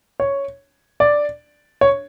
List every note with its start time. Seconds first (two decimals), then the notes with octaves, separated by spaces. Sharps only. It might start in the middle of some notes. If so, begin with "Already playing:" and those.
0.20 C#5
1.00 D5
1.81 C#5